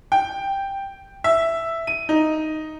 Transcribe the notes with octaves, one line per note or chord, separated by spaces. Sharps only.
G5
E5
D#7
D#4